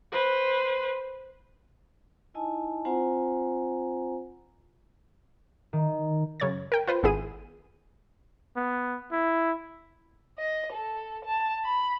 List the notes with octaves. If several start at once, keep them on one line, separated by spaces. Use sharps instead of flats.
B4 C5
D#4 E4 D#5 G#5 A5
C4 F4 C5 F#5 G#5 A#5
D#3
F#2 C#3 C#5 G#6 A6
A#4 G5
F4 B4 C5
G#1 B3 E4 G#4 D#7
B3
E4
D#5
A4
A5
B5